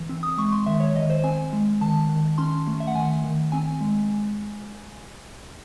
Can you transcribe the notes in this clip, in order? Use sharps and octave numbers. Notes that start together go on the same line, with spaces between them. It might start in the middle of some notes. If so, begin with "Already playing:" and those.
Already playing: E3
C4
D#6
G#3 C#6
C6
D#3 E5
C#5
D#3 D#5
C5
C4 G#5
G#3
D#3 A5
D#3
C#4 C6
A3
E5
F#5
D#3 G#5
D#3
C4 G#5
G#3